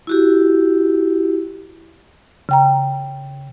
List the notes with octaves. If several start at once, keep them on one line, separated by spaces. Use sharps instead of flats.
E4 F#4 G4
C#3 G5 A#5